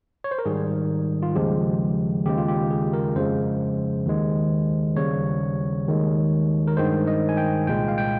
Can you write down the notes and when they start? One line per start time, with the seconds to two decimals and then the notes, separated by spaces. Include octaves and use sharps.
0.24 C#5
0.31 C5
0.39 A#4
0.45 G#2 D#3 G3 G#4
1.23 F4
1.35 D#2 C#3 F3 G#3 G4
2.26 D#2 C#3 G#3 G4
2.38 F4
2.48 G4
2.71 G#4
2.94 A#4
3.16 F2 C#3 F3 G#3 C5
4.06 D#2 D#3 G#3
4.97 D#2 C#3 G3 C#5
5.87 D#2 D#3 G#3
6.67 A#4
6.77 G2 D#3 G#3 C5
7.07 D#5
7.29 G#5
7.37 G5
7.67 C2 A#2 G#3 G5
7.88 F5
7.98 G5